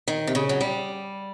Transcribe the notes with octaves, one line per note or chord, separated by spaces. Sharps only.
D#3
C3
C#3
F#3
G3